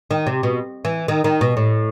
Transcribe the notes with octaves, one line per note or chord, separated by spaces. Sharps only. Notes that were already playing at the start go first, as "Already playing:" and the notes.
D#3
C3
B2
E3
D#3
D#3
B2
A2